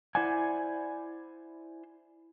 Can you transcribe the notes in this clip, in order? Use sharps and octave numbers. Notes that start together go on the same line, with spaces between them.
E4 C5 D5 F#5 G#5